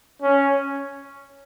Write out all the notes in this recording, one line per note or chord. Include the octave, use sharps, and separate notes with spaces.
C#4